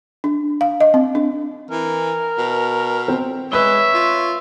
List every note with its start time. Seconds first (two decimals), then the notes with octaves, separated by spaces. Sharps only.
0.24 D4
0.61 F5
0.80 D#5
0.94 C4
1.15 D4
1.71 E3 A#4
2.38 B2
3.08 C4
3.52 G#3 B4 C#5 E5 G7
3.94 F4